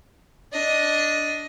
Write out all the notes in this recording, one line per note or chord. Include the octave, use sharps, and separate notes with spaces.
D4 D#5